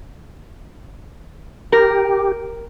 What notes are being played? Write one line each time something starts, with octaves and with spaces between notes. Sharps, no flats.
G4 A#4